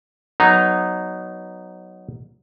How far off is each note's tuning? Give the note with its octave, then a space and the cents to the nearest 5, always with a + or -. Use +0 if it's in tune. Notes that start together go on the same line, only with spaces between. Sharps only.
F#3 +0 B3 +0 D#4 -10